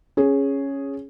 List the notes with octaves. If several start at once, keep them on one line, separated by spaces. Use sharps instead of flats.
C#4 G#4